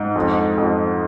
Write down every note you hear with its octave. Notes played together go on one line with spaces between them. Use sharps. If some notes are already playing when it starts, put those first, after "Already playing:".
Already playing: G#2
F2
F2